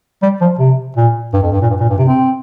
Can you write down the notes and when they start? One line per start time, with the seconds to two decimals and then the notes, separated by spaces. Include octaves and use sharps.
0.23 G3
0.41 F3
0.59 C3
0.97 A#2
1.34 G2
1.43 F2
1.52 G2
1.61 A#2
1.70 G2
1.80 A#2
1.89 G2
1.98 C3
2.08 C4